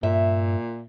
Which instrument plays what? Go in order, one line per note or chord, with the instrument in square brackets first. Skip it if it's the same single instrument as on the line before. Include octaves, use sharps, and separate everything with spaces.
[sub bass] G2 [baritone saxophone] A#2 [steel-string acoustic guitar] E5